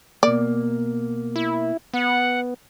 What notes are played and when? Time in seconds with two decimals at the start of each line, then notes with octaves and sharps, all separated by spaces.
0.23 B2 A#3 D5
1.36 E4
1.94 B3 F#5